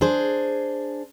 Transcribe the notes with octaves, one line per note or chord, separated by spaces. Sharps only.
D4 G#4 C5